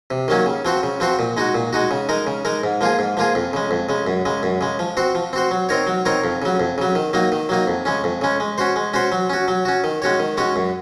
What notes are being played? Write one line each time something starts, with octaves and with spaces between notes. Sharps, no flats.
C3
D#3 F#3 A#3 C#4
C#3
F3 C4 F#4 C5
C#3
F3 C4 F#4 C5
A#2
G#3 D#4 F#4
A#2
G#3 D#4 F#4
C#3
G#3 D#4 A#4
C#3
G#3 D#4 A#4
G#2
F3 A#3 F4 G#4
G#2
F3 A#3 F4 G#4
F2
C#3 G#3
F2
C#3 G#3
F#2
C#3 G#3
F#2
C#3 G#3
F3
C4 F#4 C5
F3
C4 F#4 C5
F#3
C4 D#4 A#4 C#5
F#3
C4 D#4 A#4 C#5
F2
C#3 F#3
F2
C#3 F#3
D#3
F#3 A#3 D#4
D#3
F#3 A#3 D#4
F2
C#3 G#3 C#4
F2
C#3 G#3 C#4
G#3
C#4 F#4 C5
G#3
C#4 F#4 C5
F#3
C#4 F#4
F#3
C#4 F#4
D#3
G#3 C#4 F#4 C#5
D#3
G#3 C#4 F#4 C#5
F#2